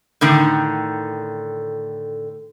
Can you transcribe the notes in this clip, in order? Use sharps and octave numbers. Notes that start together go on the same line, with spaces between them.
A2 D3 D#3